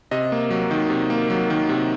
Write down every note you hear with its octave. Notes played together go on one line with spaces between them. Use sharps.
C3 D#5
A#3
F#3
D#3
C3
A#3
F#3
D#3
C3